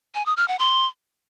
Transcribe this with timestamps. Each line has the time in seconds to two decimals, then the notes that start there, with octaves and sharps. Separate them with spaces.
0.15 G#5
0.26 D#6
0.37 F6
0.48 F#5
0.59 C6